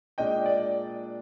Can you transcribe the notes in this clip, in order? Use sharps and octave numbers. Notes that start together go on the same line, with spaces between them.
A#2 G#3 D4 D#5 G5
D5